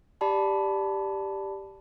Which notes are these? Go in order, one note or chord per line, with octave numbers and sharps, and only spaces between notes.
G4 D5 A5 B5